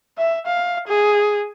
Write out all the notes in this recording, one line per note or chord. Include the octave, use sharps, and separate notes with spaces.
E5
F5
G#4